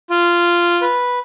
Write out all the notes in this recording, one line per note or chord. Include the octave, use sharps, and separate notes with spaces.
F4
B4